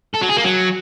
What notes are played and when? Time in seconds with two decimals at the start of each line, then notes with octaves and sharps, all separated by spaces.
0.14 A4
0.21 F#3
0.29 G#4
0.37 A#3
0.44 F#3